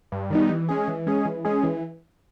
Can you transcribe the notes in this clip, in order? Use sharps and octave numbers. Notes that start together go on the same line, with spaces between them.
G2
D#3 G3 B3 D#4
E3
G#3 C#4 G#4
E3
G#3 C#4 G#4
E3
G#3 C#4 G#4
E3